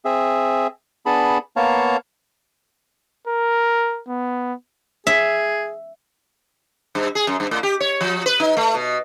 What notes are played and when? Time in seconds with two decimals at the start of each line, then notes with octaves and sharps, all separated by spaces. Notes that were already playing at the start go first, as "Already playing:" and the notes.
0.05 C4 G#4 E5
1.06 B3 D4 G#4 A5 B5
1.56 A#3 B3 C#5 F5 A5 A#5
3.28 A#4
4.09 B3
5.07 G#4 E5
6.95 G2
7.15 G#4
7.27 F#2
7.40 G2
7.51 A2
7.63 G4
7.80 C#5
8.01 F3
8.26 B4
8.40 D#4
8.57 A3
8.74 B2